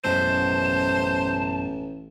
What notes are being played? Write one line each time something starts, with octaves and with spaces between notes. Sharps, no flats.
A1 F#2 B2 G#3 C5 A5